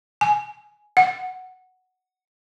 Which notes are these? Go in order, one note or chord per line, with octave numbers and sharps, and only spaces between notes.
G#5
F#5